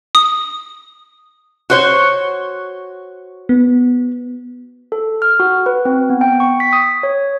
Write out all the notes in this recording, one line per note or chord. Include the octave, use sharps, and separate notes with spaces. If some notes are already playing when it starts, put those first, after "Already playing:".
D#6
F#4 C5 C#5
B3
A4
F6
F#4
B4
C4
B3
G5
C#6
B6
D#6
C#5